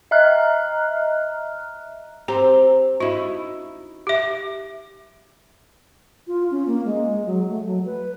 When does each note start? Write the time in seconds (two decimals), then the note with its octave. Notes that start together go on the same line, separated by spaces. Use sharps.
0.11 D#5 E5 A#5 F6 F#6
2.28 C4 G4 A#5
3.00 D#4 E4 F#4
4.07 G4 E5
6.27 F4
6.51 C#4
6.67 A#3
6.85 G#3
7.26 F#3
7.49 A3
7.66 F#3
7.86 B4